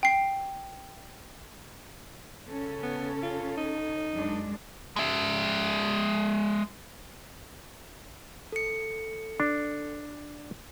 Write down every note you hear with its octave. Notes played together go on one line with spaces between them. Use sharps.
G5 C7
C#3 C#4 A4
B3
F4
D#4
F#2 G#3 D4
G#3 E5
A4 C#7
D4